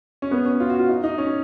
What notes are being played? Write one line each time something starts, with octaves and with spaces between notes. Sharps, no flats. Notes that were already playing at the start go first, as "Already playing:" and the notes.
C#4
B3
C#4
F4
F#4
F4
D#4
D#4
C#4